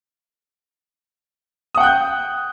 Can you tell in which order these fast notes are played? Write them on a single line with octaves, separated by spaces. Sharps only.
D#6 F#5 G5 F#6 G6